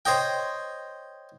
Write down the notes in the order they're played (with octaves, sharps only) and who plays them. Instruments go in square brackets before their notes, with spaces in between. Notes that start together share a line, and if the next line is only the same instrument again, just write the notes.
[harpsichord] C5 C#5 D#5 G5